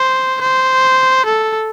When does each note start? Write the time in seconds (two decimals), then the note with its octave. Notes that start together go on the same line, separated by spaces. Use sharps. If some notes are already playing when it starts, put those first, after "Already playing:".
Already playing: C5
0.42 C5
1.26 A4